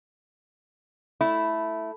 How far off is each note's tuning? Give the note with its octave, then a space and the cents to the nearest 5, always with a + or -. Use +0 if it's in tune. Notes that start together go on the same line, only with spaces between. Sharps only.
A3 +0 E4 +0